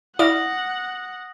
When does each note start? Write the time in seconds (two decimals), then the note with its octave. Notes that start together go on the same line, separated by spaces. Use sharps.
0.19 E4 D5 F5 F#5 D#6 A#6